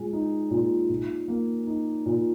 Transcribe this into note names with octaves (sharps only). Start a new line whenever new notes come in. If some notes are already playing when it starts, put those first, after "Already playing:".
Already playing: A#2 G#3
D#4
A#2
A#2
A#3
D#4
A#2